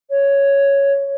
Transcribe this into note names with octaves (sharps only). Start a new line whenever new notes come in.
C#5